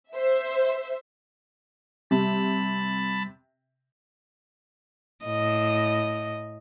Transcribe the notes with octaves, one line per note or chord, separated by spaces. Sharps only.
C5 E5
C3 G3 A5 B5
A2 D#5